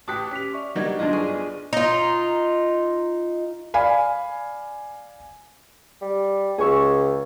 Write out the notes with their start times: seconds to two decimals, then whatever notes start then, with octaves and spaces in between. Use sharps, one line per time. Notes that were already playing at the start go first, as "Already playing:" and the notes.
0.08 A1 G4 A5 D6 D#6 F#6 B6
0.31 C#4 G4 B6 F7
0.54 D5 E5 C#6
0.76 F#3 G3 A#3 D4 D#4 F#4 G4 G#6
0.99 G1 G3 D4 E4 F4 D#5
1.13 G#4 C#6
1.73 D#4 F4
3.74 D5 F5 G#5 B5
6.02 G3
6.58 C#2 G#4 C#6 E6